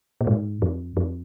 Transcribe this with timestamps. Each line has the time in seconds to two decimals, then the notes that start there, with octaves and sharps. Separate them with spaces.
0.21 A#2
0.27 G#2
0.62 F2
0.97 F2